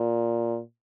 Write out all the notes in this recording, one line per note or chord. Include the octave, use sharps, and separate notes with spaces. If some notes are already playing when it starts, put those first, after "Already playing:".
Already playing: A#2